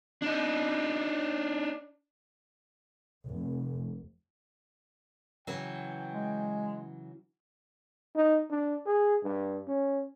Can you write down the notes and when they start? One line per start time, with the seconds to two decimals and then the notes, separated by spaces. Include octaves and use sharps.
0.22 D4 D#4
3.26 F1
5.47 C#3 E3 F#3 G5
6.11 G#3
8.16 D#4
8.50 D4
8.86 G#4
9.24 G2
9.68 C#4